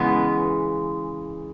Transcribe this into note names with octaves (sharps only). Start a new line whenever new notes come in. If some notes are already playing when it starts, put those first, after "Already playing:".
Already playing: C#3 E3 G#3 B3